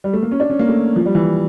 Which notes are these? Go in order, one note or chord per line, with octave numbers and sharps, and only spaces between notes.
G3
A3
A#3
C#4
D4
C#4
A#3
A3
F3
G3
E3